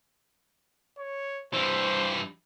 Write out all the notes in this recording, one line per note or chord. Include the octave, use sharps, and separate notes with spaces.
C#5
G2 E3 C5